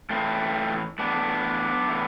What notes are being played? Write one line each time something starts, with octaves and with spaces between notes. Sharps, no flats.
A2 E3 A3 C4
A2 E3 B3 D4
A2 E3